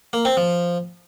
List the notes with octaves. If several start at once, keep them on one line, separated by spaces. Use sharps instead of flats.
A#3
C4
F3